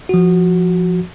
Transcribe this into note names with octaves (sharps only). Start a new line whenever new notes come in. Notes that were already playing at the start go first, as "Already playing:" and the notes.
F3 F#4